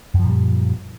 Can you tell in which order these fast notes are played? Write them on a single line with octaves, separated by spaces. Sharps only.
F#2 F3 A#2 G3